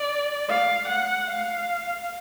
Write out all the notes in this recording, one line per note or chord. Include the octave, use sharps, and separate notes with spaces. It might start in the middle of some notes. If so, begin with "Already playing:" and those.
Already playing: D5
F5
F#5
F5